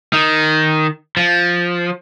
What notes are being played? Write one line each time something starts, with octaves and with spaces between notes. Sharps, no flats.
D#3
F3